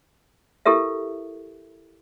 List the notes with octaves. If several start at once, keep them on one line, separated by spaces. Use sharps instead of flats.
E4 G4 A4 A#4 E5